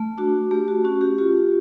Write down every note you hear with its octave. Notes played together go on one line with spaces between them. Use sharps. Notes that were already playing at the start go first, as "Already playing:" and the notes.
Already playing: A3
D4 F#4
A3 G4
F#4
C#4 F#4
G4
F4 G4